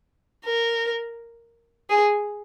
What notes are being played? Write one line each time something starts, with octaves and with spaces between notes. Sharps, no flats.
A#4
G#4